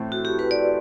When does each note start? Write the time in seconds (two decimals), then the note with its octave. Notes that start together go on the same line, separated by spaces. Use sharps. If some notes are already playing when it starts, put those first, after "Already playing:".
Already playing: A2 E3 A3 C4
0.12 F#4
0.25 G4
0.39 B4
0.51 D5